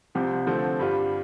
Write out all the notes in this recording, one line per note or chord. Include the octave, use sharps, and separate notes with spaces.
C2 C3 F3 C4 G4
D3 F3 A3 C4
G2 G3 F4